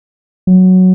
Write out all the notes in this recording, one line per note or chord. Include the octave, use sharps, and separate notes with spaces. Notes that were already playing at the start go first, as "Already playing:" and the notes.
F#3